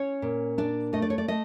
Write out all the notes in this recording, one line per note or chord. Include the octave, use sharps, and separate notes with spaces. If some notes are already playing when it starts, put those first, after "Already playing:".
Already playing: C#4 C#5
A#2
D4 D5
A3 D#5
D5
C#5
D5
A3 D#5